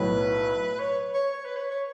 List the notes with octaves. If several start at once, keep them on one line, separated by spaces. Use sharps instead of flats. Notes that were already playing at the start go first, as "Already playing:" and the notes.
Already playing: B1 A2 F#3 B4
C#5
C#5
C#5
B4
C#5
C#5